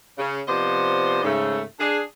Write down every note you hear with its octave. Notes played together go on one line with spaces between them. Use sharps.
C#3
C3 F3 B3 C5 D5 D#5
G#2 C#3 A3
D4 G#4